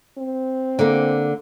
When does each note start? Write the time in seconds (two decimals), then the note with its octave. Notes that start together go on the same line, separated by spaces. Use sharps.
0.18 C4
0.79 D3 A#3